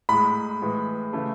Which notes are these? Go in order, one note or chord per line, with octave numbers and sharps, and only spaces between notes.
A2 G#3 B5
A2 E3 G#3
C#3 E3 A3